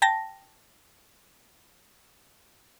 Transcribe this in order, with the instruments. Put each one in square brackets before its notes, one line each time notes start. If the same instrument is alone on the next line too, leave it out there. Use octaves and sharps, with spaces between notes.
[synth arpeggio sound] G5 A5 A#6